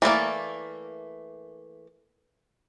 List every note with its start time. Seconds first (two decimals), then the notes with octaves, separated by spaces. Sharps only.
0.02 E3 A3 A#3 D5